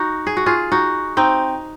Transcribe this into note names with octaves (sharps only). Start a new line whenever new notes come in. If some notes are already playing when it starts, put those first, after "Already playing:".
Already playing: D#4 F#4
G#4
F#4
F4 G#4
D#4 F#4
C4 D#4